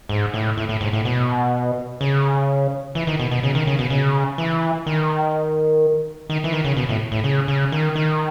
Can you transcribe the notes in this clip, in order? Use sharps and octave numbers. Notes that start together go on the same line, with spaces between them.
G#2
A2
A2
A2
G#2
A2
B2
C#3
E3
D#3
B2
B2
C#3
D#3
C#3
B2
C#3
E3
D#3
D#3
E3
D#3
C#3
B2
A2
A2
C#3
C#3
D#3
D#3